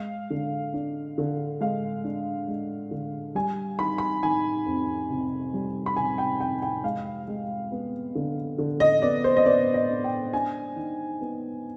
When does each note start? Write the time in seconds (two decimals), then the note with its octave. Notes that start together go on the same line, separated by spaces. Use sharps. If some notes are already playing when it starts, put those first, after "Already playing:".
Already playing: G#3 F5
0.30 D3
0.74 D4
1.18 D3
1.61 G#3 F5
2.04 D4
2.48 G#3
2.91 D3
3.35 G3 G#5
3.79 D#3 B5
3.98 B5
4.23 D#3 G#5
4.66 F2
5.10 C3
5.54 G3
5.86 B5
5.96 C3 G#5
6.18 G5
6.40 F2 G5
6.62 G5
6.84 G#3 F5
7.28 G#3
7.72 B3
8.15 D3
8.58 D3
8.80 D#5
9.02 B3 D5
9.24 C5
9.37 D#5
9.46 B3 D5
9.74 D#5
9.90 D4
10.04 G5
10.33 D4 G#5
10.76 D#3
11.21 B3